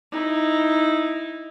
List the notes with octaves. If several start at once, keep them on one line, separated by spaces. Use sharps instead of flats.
D#4 E4